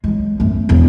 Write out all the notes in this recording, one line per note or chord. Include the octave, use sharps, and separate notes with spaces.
F#3 G#3
F#2 A3
E1 F3